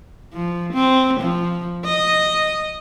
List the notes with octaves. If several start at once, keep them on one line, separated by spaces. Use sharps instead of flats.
F3
C4
F3
D#5